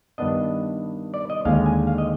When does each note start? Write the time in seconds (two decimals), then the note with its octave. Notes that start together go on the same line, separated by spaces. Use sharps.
0.18 G2 D#3 B3 D4 D#5
1.14 D5
1.30 D#5
1.45 D#2 D3 G#3 F5
1.66 G#5
1.87 F5
1.98 D#5